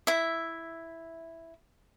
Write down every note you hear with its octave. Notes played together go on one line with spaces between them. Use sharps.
E4 E5